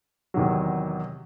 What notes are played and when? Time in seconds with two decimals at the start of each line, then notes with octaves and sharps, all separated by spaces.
0.34 E2 C3 D#3 F#3